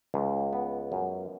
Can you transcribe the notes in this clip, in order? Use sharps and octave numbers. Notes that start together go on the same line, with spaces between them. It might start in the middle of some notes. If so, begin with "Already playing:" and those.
C#2
B3
F#2